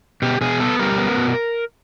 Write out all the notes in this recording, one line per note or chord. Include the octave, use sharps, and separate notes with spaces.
B2 G4
B2 G#4
B3 A4
G3 A#4
B3
B2